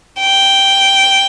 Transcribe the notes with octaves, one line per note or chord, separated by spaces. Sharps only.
G5